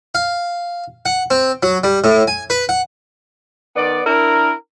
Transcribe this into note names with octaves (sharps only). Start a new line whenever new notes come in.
F5
F#5
C4
F#3
G3
A2
G#5
B4
F#5
D#3 B3 D5
D4 E4 A#4